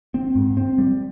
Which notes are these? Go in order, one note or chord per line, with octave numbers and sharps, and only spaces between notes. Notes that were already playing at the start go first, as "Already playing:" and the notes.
C4
G#2
C4
G3